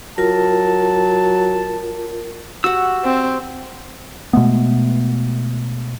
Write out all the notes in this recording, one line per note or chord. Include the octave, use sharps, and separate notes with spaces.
F#3 F4 A#4 A5
F#4 G4 F#5 E6
C4
B2 G#3 A3 B3